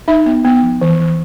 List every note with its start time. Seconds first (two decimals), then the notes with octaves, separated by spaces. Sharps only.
0.08 D#4 E5
0.26 B3
0.44 B3
0.63 F3
0.82 E3
1.00 E3